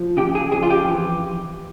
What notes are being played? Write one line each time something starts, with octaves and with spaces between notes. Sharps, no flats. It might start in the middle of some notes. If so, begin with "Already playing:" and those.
Already playing: F3
C#3 G4
G#4
F2 G#4
F4
G4
E3